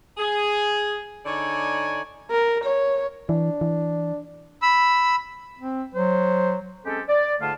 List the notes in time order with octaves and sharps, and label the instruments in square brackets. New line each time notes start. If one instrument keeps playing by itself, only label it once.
[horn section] G#4
D3 D#4 C#5 D5 G#5
[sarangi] A#4
C#5
[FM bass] E3 [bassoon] D4
[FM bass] E3
[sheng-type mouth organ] B5 E6
[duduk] C4
[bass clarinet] F#3 [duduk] C5
[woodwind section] G#3 C4 C#4 G4 A4
D5
G#2 D3 A3 F4 F5 A5